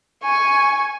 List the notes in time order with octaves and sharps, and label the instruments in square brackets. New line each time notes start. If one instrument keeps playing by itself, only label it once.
[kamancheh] G#5 C#6